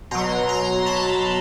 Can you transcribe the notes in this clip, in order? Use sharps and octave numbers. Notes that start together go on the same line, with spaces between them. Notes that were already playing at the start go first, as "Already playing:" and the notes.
B2 F#3 A#5 C6
A#5 C6
A5 B5